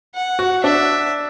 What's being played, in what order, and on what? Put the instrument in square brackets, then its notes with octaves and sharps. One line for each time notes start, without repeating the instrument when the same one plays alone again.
[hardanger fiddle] F#5
[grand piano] F#4
[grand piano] D4 [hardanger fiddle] E5